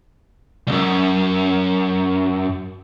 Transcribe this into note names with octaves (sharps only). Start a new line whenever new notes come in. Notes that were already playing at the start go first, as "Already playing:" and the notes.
C2 F#2